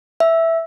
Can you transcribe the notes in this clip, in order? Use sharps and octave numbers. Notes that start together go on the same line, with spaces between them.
E5